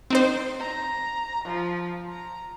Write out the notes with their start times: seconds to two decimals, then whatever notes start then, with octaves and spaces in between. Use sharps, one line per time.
0.10 C4 D#4 C5
0.59 A#5
1.44 F3
2.09 A#5